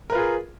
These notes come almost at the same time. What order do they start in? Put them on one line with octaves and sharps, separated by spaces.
A#4 B4 F4 G#4